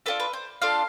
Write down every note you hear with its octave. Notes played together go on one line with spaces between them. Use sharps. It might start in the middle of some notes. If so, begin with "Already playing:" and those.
D4 F4 A4 B4
B4
C5
D4 F4 A4 F5